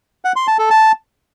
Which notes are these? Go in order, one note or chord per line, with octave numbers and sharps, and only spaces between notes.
F#5
C6
A5
A4
A5